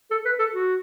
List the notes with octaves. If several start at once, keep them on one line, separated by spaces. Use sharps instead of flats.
A4
B4
A4
F#4